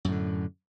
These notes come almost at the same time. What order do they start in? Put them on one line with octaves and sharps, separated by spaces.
F#2 A2 D3